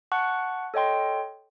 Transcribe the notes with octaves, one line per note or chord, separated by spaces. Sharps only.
F#5 A5 C#6 F#6
A4 C#5 D#5 G5 C6